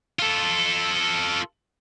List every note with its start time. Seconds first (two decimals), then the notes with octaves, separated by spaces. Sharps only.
0.19 F4 A4